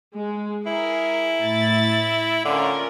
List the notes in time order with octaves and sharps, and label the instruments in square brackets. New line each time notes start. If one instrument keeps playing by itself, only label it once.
[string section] G#3
[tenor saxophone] E4 [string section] G#4 A#4
[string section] A2 A6
[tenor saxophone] D3 [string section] C#4 F4 A#4